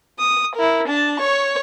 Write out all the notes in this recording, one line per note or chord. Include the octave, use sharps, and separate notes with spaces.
D#6
E4 A#4
D4 A5
C#5 C#6